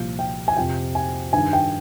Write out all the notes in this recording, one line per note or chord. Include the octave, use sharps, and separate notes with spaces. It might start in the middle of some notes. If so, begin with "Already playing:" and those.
Already playing: C2 A#2 F3 F5
G5
G#5
F2 C3 F3 G5
G#5
G2 D#3 G#5
G5